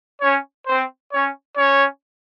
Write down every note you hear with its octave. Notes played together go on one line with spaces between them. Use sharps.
C#4 C#5
C4 C5
C#4 C#5
C#4 C#5